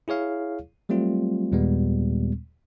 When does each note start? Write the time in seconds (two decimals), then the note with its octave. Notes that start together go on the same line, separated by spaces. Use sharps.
0.08 E4 G#4 C#5 F5
0.89 F#3 G3 A3 C4 F4
1.52 D#2 A#2 G3 G#3 B3